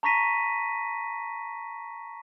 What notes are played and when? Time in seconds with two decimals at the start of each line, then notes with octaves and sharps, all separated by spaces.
0.03 A5 A#5 C#6 A#6 B6 D#7